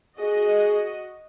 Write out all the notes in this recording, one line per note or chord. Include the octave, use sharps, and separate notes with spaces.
F#4 G#4 D#5